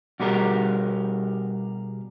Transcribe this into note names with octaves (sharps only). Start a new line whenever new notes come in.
B2 G3 G4 G#4 A#4